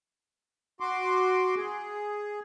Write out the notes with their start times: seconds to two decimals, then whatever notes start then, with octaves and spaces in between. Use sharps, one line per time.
0.80 F#4 C6 D6
1.56 G#4